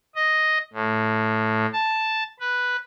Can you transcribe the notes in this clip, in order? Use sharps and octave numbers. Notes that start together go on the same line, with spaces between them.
D#5
A2
A5
B4